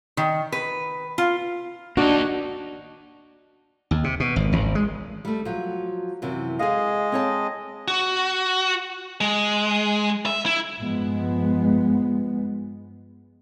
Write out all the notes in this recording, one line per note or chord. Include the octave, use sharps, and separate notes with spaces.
D#3
B4
F4
A#3 D4 D#4 F#4
D#2
C3
B2
G#1
G#1
G#3
G3 A3
F3 F#3
F#2 C3 E3
G#3 G#4 D#5 F5
C4 C#5 A5
F#4
G#3
E5
E4
G2 F3 G#3 B3